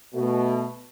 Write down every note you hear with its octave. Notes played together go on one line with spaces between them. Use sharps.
B2 A3